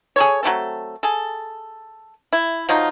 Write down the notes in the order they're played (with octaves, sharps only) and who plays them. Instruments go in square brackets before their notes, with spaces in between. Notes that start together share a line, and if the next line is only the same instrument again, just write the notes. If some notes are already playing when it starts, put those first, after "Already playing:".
[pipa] G#4 A4 C#5
F#3 A3 C4 A4
G#4 A4
E4
F3 F#3 D#4 F4